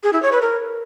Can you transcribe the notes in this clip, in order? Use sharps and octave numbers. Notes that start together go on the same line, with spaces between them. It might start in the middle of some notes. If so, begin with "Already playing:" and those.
G#4
E4
C#5
B4
A#4